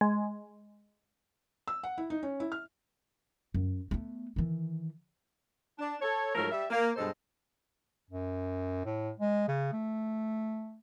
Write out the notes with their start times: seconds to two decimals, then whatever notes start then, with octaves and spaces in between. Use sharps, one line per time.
0.01 G#3
1.68 E6
1.83 F#5
1.98 E4
2.10 D#4
2.23 C#4
2.40 E4
2.52 F6
3.54 F#2
3.91 A3 B3
4.36 D#3 E3
5.78 D4
6.01 A4 C#5
6.35 G#2 F3 F#3 A3 A#4
6.51 G3 E5
6.70 A#3
6.96 G2 B2 G#3 A4 C5 D#5
8.10 F#2
8.85 A2
9.20 G#3
9.48 C#3
9.73 A3